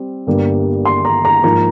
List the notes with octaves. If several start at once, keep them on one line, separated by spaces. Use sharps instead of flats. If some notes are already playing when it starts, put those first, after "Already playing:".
Already playing: G3 C4
G1 G2 G3 A#3
C6
A#5
A#5
G#2 F3 A#3 A#5